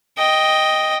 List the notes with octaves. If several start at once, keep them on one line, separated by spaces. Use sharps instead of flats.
D#5 G5